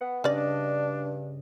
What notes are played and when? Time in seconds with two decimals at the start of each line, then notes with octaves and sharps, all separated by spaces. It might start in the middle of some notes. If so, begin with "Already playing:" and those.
0.01 B3 F#5
0.24 G2 C#3 C#4 D4 D5 D#5